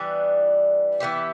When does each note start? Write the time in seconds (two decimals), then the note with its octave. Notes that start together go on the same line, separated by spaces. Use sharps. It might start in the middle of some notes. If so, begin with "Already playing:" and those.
Already playing: E3 G3 B3 D4
1.00 E3 B3 E4 G4